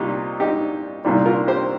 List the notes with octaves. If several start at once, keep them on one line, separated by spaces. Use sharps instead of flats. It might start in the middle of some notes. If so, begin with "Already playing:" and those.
Already playing: C2 A#2 G3 D#4 G4
D#4 G4
C2 A#2 G3
F4 A#4
G4 C5